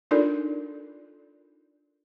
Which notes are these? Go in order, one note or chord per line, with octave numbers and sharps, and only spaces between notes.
D4 D#4 F4 A4 A#4 D5